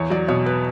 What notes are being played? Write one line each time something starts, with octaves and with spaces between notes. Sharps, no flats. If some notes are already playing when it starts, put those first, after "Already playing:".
Already playing: E2 C#5
F#3 D5
B2 C#5
B4